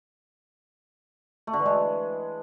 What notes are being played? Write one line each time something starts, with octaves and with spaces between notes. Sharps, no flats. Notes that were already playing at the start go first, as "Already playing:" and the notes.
A3
D3
E3
G#3